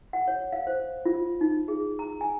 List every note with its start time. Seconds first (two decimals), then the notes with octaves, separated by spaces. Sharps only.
0.13 F#5
0.28 C#5
0.52 F5
0.67 C5
1.05 F4
1.41 D#4
1.68 G#4
1.99 A#5
2.21 G#5